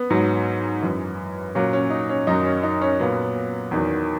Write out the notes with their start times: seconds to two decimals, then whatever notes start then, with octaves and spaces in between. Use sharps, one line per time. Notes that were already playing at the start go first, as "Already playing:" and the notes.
Already playing: B3
0.10 G#2 F#3
0.82 F#2 E3
1.55 A#2 F#3 C#4
1.73 C#4
1.90 D#4
2.09 C#4
2.27 F#2 D#3 F#3 D#4
2.45 C#4
2.63 D#4
2.81 C#4
3.00 A#2 F#3 B3
3.71 E2 D#3 F#3